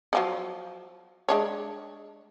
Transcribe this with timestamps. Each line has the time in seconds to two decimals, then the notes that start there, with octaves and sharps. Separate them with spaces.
0.13 D3 F3 F#3
1.29 G#3 D4 C#5